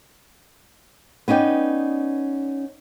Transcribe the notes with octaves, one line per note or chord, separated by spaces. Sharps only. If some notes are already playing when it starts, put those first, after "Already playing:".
B3 C#4 D#4 D5 G5